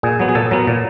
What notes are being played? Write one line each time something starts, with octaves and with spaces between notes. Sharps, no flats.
A#2 G#4
F#3 B3
G#4
A#2 A4
F#3 B3 A#4
A#2